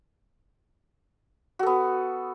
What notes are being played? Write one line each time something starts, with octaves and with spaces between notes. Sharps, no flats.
B3 F#4 A4